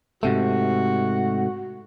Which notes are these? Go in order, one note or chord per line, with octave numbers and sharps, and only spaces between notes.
G#2 C3 A3 F#4